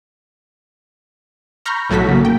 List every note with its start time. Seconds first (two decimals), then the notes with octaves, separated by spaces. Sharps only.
1.65 A#5 B5 C#6 F6 G6 A#6
1.90 B1 A2 F#3 F#4 A4 B6
2.09 C#3 A#3
2.25 G5